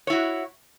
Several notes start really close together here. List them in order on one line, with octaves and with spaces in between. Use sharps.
C#5 E4 F#4